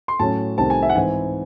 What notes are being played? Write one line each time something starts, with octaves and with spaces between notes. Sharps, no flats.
C6
A2 F#3 C#4 A5
C2 C3 D#3 A3 C4 A5
G#5
E5
F#5
G#2 E3 C4 G#5